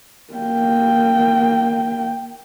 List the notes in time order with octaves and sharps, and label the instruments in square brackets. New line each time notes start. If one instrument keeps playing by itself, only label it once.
[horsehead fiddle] A#3 G5